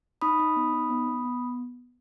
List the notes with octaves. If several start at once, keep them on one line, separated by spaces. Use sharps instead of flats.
D#4 B5 D#6
D#4
B3
D#4
B3
B3
B3